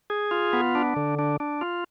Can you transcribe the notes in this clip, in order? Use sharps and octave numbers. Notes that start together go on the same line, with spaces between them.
G#4
F4
B3
D4
D3
D4
D4
F4